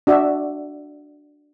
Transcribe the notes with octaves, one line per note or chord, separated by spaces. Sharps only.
D4 F#4 D5 E5